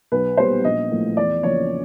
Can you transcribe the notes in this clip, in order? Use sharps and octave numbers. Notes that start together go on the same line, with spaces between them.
B1 B4
A#2 G3 B3 C5
A#1 D#5
A2 F3 A#3
E2 D5
C#3 F3 A#3 C#5